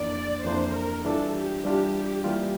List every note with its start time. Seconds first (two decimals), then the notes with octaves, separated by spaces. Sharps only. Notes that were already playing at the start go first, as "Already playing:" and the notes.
Already playing: F2 E3 A#3 D4 D5
0.44 F2 E3 A#3 D4 C5
0.75 A#4
1.05 E3 G3 D4 F4 A4
1.34 G4
1.64 E3 G3 D4 F4
2.24 E3 G3 A#3 F4